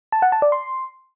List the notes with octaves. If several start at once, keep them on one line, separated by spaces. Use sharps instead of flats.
A5
F#5
A5
D5
C6